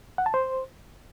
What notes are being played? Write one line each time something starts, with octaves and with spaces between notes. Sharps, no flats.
F#5
A5
C5